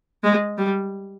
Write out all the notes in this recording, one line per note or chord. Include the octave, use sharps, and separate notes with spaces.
G#3
G3